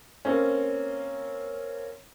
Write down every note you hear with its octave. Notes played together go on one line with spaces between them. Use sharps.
A#3 C4 C#4